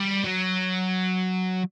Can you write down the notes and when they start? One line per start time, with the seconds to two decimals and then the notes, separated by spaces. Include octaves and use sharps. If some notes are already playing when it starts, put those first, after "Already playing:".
Already playing: G3
0.24 F#3